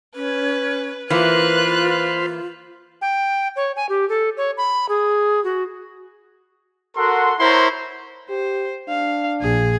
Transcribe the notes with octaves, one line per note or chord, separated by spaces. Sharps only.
C#4 B4
E3 A#3 F4 B4 C5 F5 B5 F#6
G5
C#5
G#5
G4
A4
C#5
B5
G#4
F#4
F#4 A4 A#4 F#5 C6
E4 A#4 C5 C#5 A#5 C6
G4 C5
D4 F5
A#1 G#4